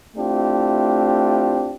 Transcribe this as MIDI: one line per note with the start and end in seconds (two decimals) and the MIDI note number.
0.16 1.76 57
0.16 1.76 60
0.16 1.76 62
0.16 1.76 64
0.16 1.76 65
0.16 1.76 67